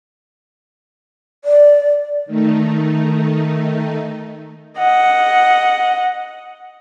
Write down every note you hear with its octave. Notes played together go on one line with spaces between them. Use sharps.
D5
D#3 A3 D#4
D#5 F#5